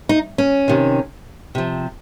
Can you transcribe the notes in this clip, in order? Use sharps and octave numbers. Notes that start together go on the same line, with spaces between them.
D#4
C#4
C3 D#3
C3 F3